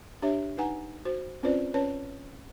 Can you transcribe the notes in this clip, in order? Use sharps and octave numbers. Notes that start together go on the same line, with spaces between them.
D4 G4 C#5 E5
D#4 B4 F#5 G#5 A#5
F#4 C5
C4 C#4 F4 B4 C5 D5
C#4 B4 C#5 A5